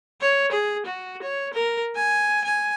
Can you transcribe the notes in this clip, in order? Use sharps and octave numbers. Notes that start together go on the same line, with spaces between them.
C#5
G#4
F#4
C#5
A#4
G#5
G#5